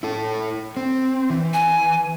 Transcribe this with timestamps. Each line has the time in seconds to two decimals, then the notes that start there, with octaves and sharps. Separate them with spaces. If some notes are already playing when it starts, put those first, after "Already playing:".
0.03 E4 A4
0.77 C4
1.30 E3
1.53 G#5